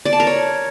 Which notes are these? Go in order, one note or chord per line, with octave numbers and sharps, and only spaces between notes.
D5
A5
A#4
C#5